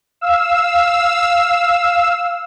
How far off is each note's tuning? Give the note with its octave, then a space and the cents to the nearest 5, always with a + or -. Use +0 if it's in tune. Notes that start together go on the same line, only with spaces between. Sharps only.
F5 +0 E6 +0